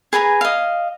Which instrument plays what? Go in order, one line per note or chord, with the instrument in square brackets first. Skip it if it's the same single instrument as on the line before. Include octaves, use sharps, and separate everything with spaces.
[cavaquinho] G#4 B4 G#5 A#5
D#5 F5